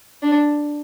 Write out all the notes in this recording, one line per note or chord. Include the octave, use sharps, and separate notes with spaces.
D4